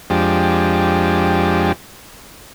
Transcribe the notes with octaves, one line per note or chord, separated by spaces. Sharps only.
F2 F3 G#3 D4 G4